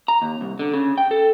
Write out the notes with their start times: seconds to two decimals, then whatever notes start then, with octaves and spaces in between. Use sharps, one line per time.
0.08 A#5
0.22 D#2
0.41 C2
0.59 D3
0.74 C#3
0.98 G5
1.11 A4